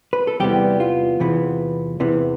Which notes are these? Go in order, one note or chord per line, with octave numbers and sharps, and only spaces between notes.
B4
A4
E2 C3 E3 G3 B3 G4
F4
E2 C3 E3 B3
E2 C3 E3 B3